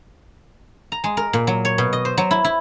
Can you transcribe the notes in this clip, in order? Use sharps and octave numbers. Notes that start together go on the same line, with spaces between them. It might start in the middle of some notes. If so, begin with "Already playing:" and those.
A#5
G#3
A#4
A#2
F#3
C#5
B2
D#5
C5
F#3
E4
E4